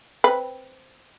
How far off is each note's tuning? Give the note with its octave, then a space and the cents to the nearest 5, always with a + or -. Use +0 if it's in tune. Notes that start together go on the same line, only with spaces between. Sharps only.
C4 +0 B4 +0 B5 -15